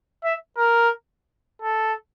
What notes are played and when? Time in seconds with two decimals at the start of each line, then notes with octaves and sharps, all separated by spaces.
0.24 E5
0.58 A#4
1.62 A4